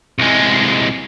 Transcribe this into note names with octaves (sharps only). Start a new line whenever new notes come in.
C2 G#3